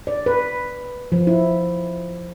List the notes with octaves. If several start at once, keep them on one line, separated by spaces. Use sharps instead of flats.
D5
B4
F3
E4